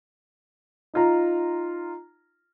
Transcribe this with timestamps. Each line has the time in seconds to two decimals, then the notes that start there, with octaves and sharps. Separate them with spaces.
0.94 D#4 F4 A#5